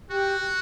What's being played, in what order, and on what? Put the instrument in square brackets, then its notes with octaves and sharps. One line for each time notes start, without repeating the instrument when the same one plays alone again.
[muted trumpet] F#4 [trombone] G4